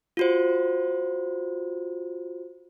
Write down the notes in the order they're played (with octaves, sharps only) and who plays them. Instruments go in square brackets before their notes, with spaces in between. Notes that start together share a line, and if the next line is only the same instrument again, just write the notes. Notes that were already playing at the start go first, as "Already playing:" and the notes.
[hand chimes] F4 F#4 C5